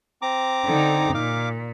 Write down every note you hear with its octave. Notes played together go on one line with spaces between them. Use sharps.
C4 A#5 D6
D3 D#4
A#2 F5 D6